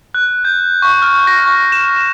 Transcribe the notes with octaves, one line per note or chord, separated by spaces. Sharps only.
F#6
G6
C#6
F6
A#6
C#6
E7